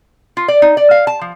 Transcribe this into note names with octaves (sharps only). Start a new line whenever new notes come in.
F4
D5
D#4
D5
F5
A5
F3